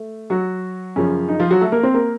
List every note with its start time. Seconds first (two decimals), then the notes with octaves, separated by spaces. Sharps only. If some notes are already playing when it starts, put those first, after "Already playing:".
Already playing: A3
0.30 F#3 F#4
0.96 F#2 C#3 F3 C#4
1.28 D#4
1.40 F3 F4
1.51 F#3 F#4
1.61 A3 A4
1.72 A#3 A#4
1.83 C4 C5
1.94 A#3 A#4